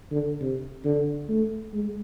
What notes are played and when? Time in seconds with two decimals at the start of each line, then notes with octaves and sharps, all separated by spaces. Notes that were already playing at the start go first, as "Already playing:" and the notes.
0.11 D3
0.41 C3
0.85 D3
1.29 A3
1.73 G#3